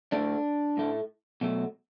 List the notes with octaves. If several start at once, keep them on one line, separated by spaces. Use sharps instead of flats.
A2 A3 D4
A2 A3
B2 F#3 A3